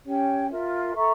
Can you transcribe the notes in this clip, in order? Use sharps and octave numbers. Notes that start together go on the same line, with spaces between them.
C#4 G4 C#5 G5
F4 A#4 E5
A4 E5 A#5 C#6